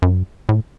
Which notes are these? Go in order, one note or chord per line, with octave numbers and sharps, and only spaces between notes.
F#2
A2